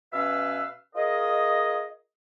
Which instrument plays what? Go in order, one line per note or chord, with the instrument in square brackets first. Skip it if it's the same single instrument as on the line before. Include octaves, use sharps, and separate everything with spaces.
[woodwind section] B2 C#4 B4 E5 F5 E6
F4 G#4 A#4 D#5